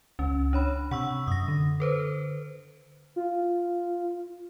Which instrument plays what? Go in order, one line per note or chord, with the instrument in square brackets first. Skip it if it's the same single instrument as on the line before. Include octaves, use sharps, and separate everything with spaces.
[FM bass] C#2 [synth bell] C#4
[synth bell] D4 C#5 B5
[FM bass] C3 [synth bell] F#5 C#6 E6
[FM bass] F#2 [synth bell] D#6 A#6
[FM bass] D3
[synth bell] A4 B4 C5
[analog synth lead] F4